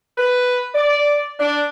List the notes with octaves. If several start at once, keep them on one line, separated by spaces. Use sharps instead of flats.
B4
D5
D4